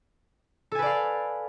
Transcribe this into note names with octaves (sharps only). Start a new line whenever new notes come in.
A4 B4 D5 F5 G#5